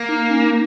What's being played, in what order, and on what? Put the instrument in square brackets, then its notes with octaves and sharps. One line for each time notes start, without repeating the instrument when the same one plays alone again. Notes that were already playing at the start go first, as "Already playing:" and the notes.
Already playing: [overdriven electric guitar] A#3
[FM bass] D#4
C#4
D#4